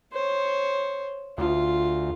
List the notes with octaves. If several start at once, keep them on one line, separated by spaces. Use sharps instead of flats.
C5 C#5
D2 F4